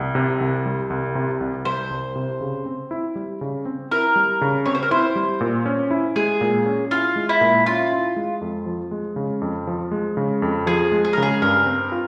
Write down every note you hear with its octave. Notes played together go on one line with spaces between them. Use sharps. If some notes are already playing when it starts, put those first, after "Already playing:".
Already playing: C2 G4
C3
C2
G3
C2
C3
C2
G3 C5
C2
C3
C#3
C4
E4
G3
C#3
C4
E4 A#4
G3
C#3
C4 C#5
C5
A#4
E4 C5
G3
A#2
C#4
E4
G#3 G#4
A#2
C#4
E4 F4
G#3
E4
A#2
C#4 F4
E4
G#3
F2
F3
G#3
C#3
F2
F3
G#3
C#3
F2
F3 G#4
G#3
G#4
A#4
C#3
G#4
G2 A#4
C4
F4